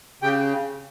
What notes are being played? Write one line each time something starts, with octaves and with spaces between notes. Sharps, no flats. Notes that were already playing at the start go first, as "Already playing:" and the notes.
C#3 G4 G5